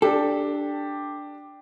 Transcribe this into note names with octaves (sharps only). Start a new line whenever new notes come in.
D4 G4 A4